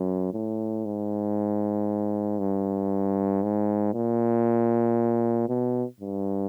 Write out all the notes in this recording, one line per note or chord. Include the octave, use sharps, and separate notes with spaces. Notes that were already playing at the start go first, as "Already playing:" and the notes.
Already playing: F#2
A2
G#2
G2
G#2
A#2
B2
G2